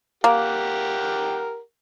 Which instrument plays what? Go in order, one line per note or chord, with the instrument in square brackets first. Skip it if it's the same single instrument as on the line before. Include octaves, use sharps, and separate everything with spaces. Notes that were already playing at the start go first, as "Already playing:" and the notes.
[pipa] A#3 [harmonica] G4 A#4 F#5